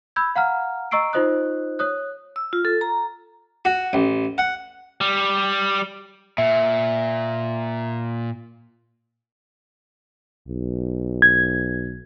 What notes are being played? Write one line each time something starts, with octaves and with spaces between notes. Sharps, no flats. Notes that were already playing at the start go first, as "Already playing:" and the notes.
B5 E6 G6 G#6
F5 F#5 A#5 F6
D#5 A#5 C#6 E6 C7 D7
D#4 F4 C5 D#5 D#6 F#6
C#5 D#6 F#6
E6
F4
A4
A#5
F#4
A1
F#5
G3
A#2 E5
B1
G#6